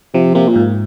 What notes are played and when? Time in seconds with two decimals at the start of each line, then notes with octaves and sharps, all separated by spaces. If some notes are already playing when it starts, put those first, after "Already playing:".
0.14 C3 F3
0.35 C3 A#3
0.49 A#2
0.56 G#2